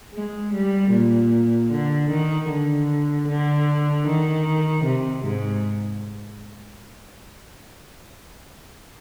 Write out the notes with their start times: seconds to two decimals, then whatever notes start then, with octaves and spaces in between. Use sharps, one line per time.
0.15 G#3
0.54 G3
0.93 A#2
1.71 D3
2.11 D#3
2.50 D3
3.28 D3
4.08 D#3
4.85 C3
5.25 G#2